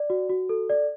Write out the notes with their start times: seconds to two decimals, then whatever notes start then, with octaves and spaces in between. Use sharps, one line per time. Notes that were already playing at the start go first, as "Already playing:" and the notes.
Already playing: D5
0.10 F#4
0.30 F#4
0.49 A4
0.70 D5